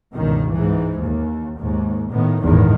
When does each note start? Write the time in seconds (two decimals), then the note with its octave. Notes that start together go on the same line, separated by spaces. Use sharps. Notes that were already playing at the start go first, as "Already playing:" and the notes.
0.14 G1 C#2 B2 D#3
0.50 G#2 E3
1.01 D#2
1.58 D#2 G#2
2.09 A2 D#3 B3
2.43 G1 E2 A2 D#3 G#3